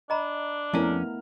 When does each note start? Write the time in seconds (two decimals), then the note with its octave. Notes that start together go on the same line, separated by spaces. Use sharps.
0.10 D4 D#5 A#5 B5
0.74 F2 A3 B3 C#4 E4 A#4 F5